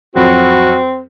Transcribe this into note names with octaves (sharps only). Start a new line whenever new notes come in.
F2 F#3 C4 F#4